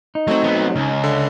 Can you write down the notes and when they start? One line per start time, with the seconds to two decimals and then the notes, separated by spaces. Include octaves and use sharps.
0.15 D#4
0.28 F#3 A3 C4
0.44 F#3 B3
0.76 C#2 C#4
1.04 D3